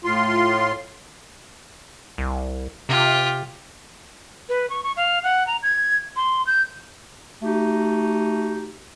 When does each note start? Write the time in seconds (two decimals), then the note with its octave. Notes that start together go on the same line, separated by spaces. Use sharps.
0.04 A2 F4 C6
2.18 C2
2.89 C3 F4 G4
4.49 B4
4.70 C#6
4.84 C#6
4.97 F5
5.24 F#5
5.47 A#5
5.63 G#6
6.16 C6
6.47 G6
7.42 A3 D#4 F#4 G4